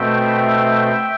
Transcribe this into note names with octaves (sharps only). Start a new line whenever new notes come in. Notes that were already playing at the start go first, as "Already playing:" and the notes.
Already playing: B2 A3 C4 E5 G5